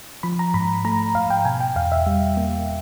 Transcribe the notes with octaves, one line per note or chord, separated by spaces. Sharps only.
F3 B5
A#5
G#2 B5
A3 A#5
G#2 F5
G5
B2 G#5
G5
E2 F5
E5
G3
A#3